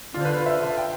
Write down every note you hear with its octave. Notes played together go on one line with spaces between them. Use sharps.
D3 F4
C5
B4
E5
G5